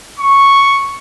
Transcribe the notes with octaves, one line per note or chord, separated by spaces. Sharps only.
C#6